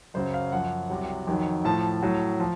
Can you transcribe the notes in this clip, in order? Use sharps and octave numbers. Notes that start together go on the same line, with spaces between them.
F#2 C#3 F#3 C5
F5
F#2 F3 F#5
C2 C3 F#3
F2 D#3 F#3
A2 F3 A5
A2 F#3
F3